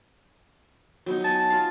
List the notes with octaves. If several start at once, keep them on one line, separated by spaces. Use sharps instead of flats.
F#3 B3 D#4
G#5 A5
F4 F5